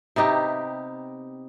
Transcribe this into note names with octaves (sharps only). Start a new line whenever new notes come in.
C3 B3 D#4 G4